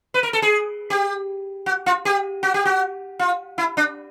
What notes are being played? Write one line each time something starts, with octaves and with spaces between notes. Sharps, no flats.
B4
A#4
A4
G#4
G4
F#4
F4
G4
F#4
G4
F#4
F4
E4
D4